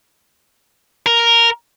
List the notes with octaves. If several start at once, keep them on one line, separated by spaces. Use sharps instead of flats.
A#4